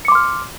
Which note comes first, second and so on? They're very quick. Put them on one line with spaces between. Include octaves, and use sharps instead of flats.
C#7 D6 C6 F6